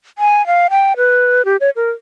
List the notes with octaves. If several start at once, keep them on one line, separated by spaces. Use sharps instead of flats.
G#5
F5
G5
B4
G4
C#5
A#4